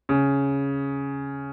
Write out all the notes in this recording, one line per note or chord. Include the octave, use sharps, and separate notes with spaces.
C#3